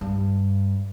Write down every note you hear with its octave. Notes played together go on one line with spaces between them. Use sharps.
G2